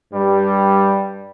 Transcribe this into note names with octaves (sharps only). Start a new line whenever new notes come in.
G2 G3